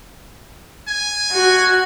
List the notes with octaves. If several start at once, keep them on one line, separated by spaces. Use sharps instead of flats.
G#5
F#4